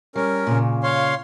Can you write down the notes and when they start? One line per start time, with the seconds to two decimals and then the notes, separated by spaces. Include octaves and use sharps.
0.16 G3 C#4 A#4
0.47 A#2 C#3
0.83 C#5 F5 C6